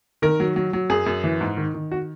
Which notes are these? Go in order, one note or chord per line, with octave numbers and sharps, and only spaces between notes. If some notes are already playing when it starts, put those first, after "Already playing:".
D#3 A#4
F#3
F#3
F#3
F#2 G#4
F#2
E3
G#2
D#3
D#3
F#4